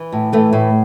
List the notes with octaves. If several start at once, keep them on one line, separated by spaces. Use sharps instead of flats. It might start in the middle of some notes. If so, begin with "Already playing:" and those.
Already playing: E3
A2
E3 A3
A2